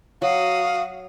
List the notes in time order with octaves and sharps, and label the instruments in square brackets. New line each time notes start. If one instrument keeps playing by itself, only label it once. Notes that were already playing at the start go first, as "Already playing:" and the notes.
[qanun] F#3 [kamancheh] F#4 D#6 [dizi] F5